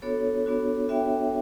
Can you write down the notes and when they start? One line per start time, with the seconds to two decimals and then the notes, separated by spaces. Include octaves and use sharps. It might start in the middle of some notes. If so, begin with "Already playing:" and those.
0.02 B3 D4 F#4 A4 C#5
0.46 B3 D4 F#4
0.89 B3 D4 F#4 E5 G5